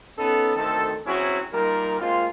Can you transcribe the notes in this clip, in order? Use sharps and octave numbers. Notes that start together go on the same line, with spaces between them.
B3 C#4 D#4 A4
D2 D#3 C4 A4
F#3 C4 C#4 E4 F#4 G#4
A#2 G3 D#4 A#4
G#3 A#3 C4 F4